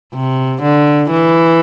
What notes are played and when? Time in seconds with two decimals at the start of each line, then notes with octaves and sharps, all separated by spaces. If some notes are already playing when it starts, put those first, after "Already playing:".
0.14 C3
0.62 D3
1.11 E3